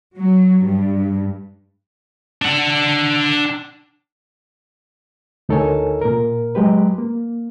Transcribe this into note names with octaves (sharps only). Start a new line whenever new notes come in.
F#3
G2
D4 F#5
D2 D#4 A4 A#4 C#5 G#5
A#2 A#4
F#3 G#3 G4 B4
A#3